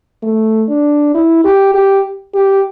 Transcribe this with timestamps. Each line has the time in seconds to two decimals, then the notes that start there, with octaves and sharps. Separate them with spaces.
0.23 A3
0.69 D4
1.14 E4
1.44 G4
1.74 G4
2.35 G4